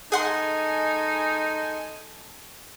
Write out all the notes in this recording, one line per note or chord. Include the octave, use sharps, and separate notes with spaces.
G#3 D#4 G#4 A4 F#5 G#5 C6